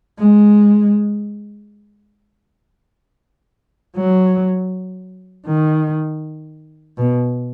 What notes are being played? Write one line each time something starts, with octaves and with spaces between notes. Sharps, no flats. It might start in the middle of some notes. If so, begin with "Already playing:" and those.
G#3
F#3
D#3
B2